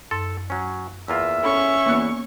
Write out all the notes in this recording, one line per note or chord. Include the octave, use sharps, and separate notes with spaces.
F#2 A4 C6 A6
F#3 C#4
E2 A#3 F4 E5
C#4 A4 B5 C#6
E2 E3 A#3 B3 F#6